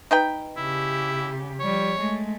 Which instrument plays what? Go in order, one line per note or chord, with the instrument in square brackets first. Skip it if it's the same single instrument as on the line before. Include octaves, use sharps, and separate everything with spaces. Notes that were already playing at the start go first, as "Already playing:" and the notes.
[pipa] D#4 B4 G5
[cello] C#3 G4 [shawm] E4
[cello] F3 G3 [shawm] C#5
[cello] G#3 A3